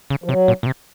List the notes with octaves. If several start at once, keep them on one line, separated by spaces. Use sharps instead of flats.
C#3
F3
C3 F#3
A#2
A#2
C3